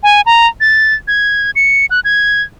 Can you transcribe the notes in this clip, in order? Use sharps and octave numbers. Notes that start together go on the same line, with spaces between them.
G#5
A#5
A6
G#6
C#7
F#6
G#6